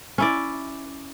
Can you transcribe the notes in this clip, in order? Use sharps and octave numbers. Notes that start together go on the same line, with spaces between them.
C#4 E4 D5